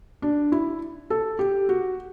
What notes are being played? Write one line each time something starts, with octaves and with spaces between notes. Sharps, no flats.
D4
E4
A4
G4
F#4